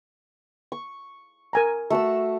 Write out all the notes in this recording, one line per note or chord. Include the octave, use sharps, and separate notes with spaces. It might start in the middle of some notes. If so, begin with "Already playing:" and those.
C#6
A#4 G#5 A#5
A3 F#4 E6